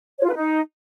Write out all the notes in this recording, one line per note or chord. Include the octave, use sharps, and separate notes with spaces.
C#5
F4
B4
D#4